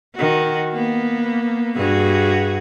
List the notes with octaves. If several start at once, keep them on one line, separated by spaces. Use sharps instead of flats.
D#3 F#4
A#3 B3
G2 F#4 G#4